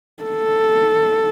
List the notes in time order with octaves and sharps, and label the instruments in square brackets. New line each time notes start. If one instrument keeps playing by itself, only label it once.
[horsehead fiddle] A4